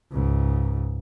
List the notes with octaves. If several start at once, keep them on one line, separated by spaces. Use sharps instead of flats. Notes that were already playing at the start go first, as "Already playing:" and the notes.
C#2 G#2